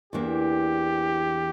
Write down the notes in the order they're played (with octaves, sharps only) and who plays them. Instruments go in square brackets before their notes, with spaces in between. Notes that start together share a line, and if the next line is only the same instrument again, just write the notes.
[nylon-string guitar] E2 E3 A#3 D4 [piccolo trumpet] G4